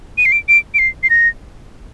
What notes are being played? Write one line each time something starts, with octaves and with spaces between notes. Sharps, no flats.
D#7
C7
D7
D7
D7
C7
C7
A#6